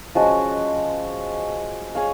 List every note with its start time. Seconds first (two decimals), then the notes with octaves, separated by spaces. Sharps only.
0.15 F3 G#3 C#4 F#4
1.95 G#4 C#5 F5